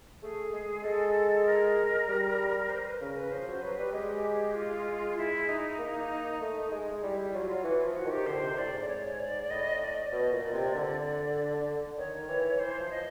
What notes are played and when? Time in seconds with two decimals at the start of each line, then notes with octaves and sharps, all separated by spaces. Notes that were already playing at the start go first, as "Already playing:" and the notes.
0.22 A3 G#4
0.53 G#3
0.84 G#3 A4
1.46 A#4
2.07 G3
2.70 C5
2.85 B4
3.01 C#3 A#4
3.16 B4
3.32 F3 C5
3.47 F#3
3.62 F#3 B4
3.78 G3
3.93 G#3 G4
4.55 F4
5.17 E4
5.49 D#4
5.79 A#3
6.41 A3
6.72 G#3
7.02 G3 E4
7.34 F#3 F4
7.64 E3 F#4
7.80 F4
7.85 F3
7.96 F#4
8.05 D#3
8.11 G4
8.26 D3 C5
8.43 C3
8.58 A2 D5
8.73 G#2
8.80 D5
8.88 C#5
9.19 D5
9.50 A2 D#5
9.81 D5
10.12 B2 D#5
10.32 A#2
10.43 D5
10.53 C3
10.74 D3
11.98 D#3 C#5
12.28 E3
12.60 E3 C5
12.80 F3
12.91 D#5